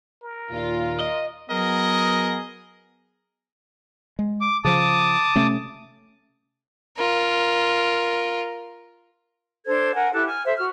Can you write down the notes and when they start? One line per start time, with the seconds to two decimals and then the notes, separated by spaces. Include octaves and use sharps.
0.23 A#4
0.52 D#2 A#2 F4
1.00 D#5
1.50 F#3 B3 G#4 A#4 D#5
4.19 G#3
4.41 D6
4.65 C#3 F3 A5 D6 D#6
5.36 C3 A3 C#4
6.97 F4 A#4
9.67 D4 A4 C5 G#6
9.95 A#4 F#5 G#5
10.13 E4 G4 A4 F#6
10.27 G#5 F6
10.45 A4 C5 E5
10.57 F#4 F6